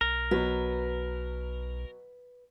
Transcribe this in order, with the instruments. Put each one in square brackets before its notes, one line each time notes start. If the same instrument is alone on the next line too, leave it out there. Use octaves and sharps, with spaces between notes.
[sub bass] B1 [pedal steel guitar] A#4
[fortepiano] B2 F#3 [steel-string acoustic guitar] B4